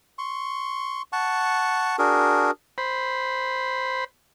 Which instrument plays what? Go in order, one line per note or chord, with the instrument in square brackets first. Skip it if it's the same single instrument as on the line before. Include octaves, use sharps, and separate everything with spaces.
[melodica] C6 C#6
F#5 A5 C#6
D4 F#4 G#4 A#4
[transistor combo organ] C5 B5